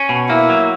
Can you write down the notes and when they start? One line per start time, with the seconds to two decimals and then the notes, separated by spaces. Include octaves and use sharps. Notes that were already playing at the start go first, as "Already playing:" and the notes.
Already playing: C#4
0.09 B2
0.29 A#3 E4
0.49 F#3